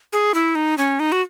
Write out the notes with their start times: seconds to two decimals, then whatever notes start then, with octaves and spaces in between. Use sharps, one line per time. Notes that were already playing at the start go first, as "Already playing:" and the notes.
0.13 G#4
0.34 E4
0.55 D#4
0.78 C#4
1.00 D#4
1.12 F#4